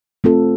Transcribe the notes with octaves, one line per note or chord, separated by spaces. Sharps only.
A3 C4 F4 A4